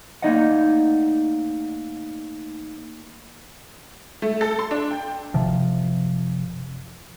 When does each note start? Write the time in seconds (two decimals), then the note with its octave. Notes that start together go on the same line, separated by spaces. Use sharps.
0.22 A3 A#3 D#4 D5 D#5 F#5
4.22 A3
4.41 A4
4.59 C6
4.71 D4
4.91 G5
5.34 F#1 C3 F3